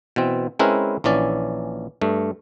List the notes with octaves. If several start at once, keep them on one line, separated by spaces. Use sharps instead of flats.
B2 E3 C4
G#3 C4 C#4 E4 A#4 B4
A#1 E3 C#4 D5
G2 A3